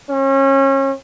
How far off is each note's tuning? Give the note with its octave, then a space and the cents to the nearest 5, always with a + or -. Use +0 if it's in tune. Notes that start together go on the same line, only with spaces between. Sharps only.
C#4 -30